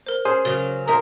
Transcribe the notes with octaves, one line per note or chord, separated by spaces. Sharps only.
A#4 C5
C#4 G#4 C5 G#5
C#3 F#3 A#4 D#6 A6
D#2 D#4 A#4 C5 A#5 D#6 B6